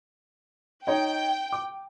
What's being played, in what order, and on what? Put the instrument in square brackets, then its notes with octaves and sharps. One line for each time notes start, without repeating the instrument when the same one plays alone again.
[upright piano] D#4 C#5 D#5 [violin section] G5
[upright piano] D6